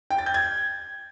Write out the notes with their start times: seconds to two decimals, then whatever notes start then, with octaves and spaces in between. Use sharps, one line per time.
0.10 G5
0.18 A6
0.26 G6
0.34 G#6